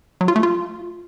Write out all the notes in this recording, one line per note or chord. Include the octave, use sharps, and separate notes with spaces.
F#3
F4
A3
F4